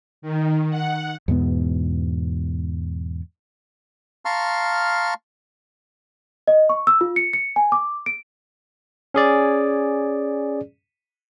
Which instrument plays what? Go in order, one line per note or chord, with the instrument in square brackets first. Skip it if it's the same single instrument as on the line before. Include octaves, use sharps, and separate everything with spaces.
[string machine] D#3
F#5
[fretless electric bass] E2 G#2 B2 B3
[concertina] F5 A5 A#5 C6 C#6 F6
[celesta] D#5
C#6
E6
F4
C#7
C#7
G#5
D6
D7
[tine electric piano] C#4 G#4 D5